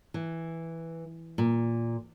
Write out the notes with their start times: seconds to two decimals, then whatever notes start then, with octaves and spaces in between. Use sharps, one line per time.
0.14 E3
1.38 A#2